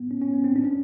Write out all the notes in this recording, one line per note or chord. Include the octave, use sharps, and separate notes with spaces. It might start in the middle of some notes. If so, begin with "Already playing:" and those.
Already playing: B3
C#4
C#4
B3
C4
D4
C#4